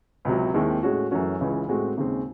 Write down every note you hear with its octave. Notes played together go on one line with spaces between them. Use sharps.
C#2 C3 F#3
D#2 D#3 G#3 C4 E4
A2 G#3 C#4 F#4
F#2 E3 A3 C#4 F#4
C#2 C#3 E3
A2 G#3 C4 F#4
D#2 C#3 G#3 C4